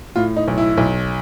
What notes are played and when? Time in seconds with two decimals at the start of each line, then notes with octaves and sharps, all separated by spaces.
0.16 A2 F4
0.36 D#4
0.48 B1
0.58 E4
0.77 B1